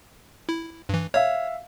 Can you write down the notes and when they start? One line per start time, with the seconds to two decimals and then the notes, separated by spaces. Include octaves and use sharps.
0.49 E4
0.89 G2 E3
1.14 C#5 E5 F5